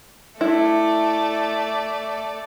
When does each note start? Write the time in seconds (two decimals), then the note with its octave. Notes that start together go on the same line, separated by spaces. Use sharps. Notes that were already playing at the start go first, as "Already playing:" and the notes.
0.41 A3 E4 D5